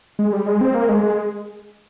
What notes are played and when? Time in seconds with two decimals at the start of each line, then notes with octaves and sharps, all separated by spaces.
0.19 G#3
0.33 G3
0.46 G#3
0.61 C4
0.74 A#3
0.89 G#3
1.03 G#3